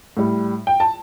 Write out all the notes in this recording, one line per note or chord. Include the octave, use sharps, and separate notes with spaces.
A2 G3
G5
A5